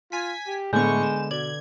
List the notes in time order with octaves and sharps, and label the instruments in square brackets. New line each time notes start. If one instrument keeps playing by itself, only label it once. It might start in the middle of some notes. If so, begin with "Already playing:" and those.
[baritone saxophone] F4 [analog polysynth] G#5 B6
[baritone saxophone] G4
[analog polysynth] A2 C#6 [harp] D3 B3 [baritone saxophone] G#3 [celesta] G#5 G6
[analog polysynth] E7
[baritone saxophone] B2 [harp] D5 [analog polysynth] G#6 [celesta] F#7